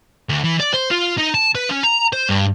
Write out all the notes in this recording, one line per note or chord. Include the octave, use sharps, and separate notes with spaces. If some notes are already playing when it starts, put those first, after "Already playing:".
D2
E3
D5
C5
F4
D#4
A5
B4
C#4
A#5
C5
G2